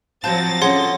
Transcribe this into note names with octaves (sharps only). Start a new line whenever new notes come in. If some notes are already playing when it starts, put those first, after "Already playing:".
F3 F#3 C4 F4 A5 G6 A6 A#6
D3 C#4 G#4 C#5 F#5 C6